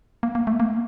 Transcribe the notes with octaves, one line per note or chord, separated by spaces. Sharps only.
A#3
A#3
A3
A#3